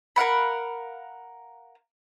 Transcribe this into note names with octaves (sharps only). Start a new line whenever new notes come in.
A#4 F5 F#5 B5